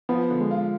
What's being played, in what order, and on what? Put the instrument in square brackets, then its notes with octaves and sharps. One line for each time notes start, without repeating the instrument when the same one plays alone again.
[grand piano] F3 [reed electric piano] B3
[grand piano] D3
[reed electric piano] G#3
[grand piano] F4